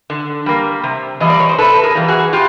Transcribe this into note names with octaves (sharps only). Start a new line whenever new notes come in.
D3
G3 A#3
C3
E3 G3 A#3 D#5
D5
C#5
C5
C3 A4 B4
G#4 A#4
E3 G3 A#3
F#4 G#4
A2 F4 G4